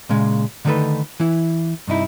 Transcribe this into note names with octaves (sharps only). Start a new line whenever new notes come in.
A#2 C#3 G#3
D3 D#3 A3 D#4 A4 B4
E3 E4
G2 C3 D#4 E4